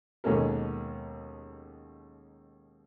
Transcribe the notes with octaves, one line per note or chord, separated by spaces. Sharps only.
D#2 B2 G#3 C#4 A4 A#4